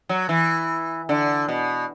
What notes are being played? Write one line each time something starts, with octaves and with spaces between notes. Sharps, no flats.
F#3
E3
D3
B2